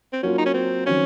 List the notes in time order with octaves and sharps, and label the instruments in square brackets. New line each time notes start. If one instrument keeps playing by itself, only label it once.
[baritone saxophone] C4
[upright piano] F#3 A#3 F4 [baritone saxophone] C#4
[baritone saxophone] D#4
C#4
C4
[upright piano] D#3 F#3 C4 F#4 C#5 [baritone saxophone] C#4